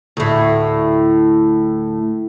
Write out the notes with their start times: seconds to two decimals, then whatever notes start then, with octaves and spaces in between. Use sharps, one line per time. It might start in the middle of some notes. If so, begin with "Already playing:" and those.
0.17 D2 A2